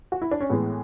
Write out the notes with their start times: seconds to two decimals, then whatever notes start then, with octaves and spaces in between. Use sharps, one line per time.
0.12 F#4
0.22 E4
0.31 D4
0.40 C#4
0.50 A2 E3 G#3 B3